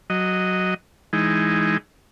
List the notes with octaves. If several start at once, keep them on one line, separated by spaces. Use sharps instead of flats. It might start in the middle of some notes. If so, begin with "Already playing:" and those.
F#3 D#5
E3 G#3 D#4